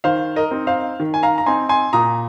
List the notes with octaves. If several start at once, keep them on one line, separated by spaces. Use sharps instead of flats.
D#3 C5 F5
A#4 D#5
C4 D#4
C5 F5
D#3
G#5
F5 A#5
A#5
C4 D#4 G#5 C6
G#5 C6
A#2 A#5 D#6